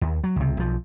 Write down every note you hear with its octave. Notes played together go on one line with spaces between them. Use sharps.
D#2
F#3
C#2 C3
B1 F3